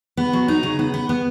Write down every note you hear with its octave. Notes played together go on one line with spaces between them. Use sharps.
B3
F#3
D#4
C#3
B3
B3
B3